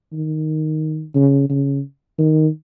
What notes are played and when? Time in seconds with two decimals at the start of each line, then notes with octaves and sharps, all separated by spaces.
0.13 D#3
1.15 C#3
1.50 C#3
2.18 D#3